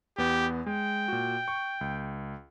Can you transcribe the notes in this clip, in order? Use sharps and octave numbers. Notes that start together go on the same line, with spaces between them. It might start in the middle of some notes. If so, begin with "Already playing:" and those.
E2 B3 G4
G#3 G5
A#2 F#4
C#6
C#2